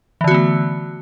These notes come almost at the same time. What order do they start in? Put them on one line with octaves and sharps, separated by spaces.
E3 D3 F#4 B3 A3